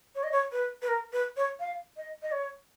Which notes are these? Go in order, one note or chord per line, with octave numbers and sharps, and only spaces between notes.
C#5
D#5
C#5
B4
B4
A#4
B4
C#5
F5
D#5
D#5
C#5